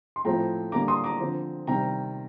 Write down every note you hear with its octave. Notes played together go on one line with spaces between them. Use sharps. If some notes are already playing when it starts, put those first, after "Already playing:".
C6
A2 F3 A3 C4 G5 A#5
D3 G3 A#3 A#5 D6
C6 D#6
A#5 D6
D3 F3 C4
C3 D#3 G3 G5 A#5